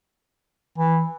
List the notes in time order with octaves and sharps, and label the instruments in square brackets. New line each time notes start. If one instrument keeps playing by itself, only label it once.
[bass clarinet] E3